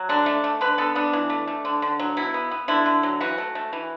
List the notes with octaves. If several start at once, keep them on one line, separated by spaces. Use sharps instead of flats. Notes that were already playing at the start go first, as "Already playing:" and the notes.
Already playing: F#3
D3 D4
A3
A3
D3 B4
B3 A4
B3 D4
E3
A3
A3
D3
D3
F#3
B2 E4
B3
B3
D3 E4
D3
F#3
E3 F#4
A3
A3
E3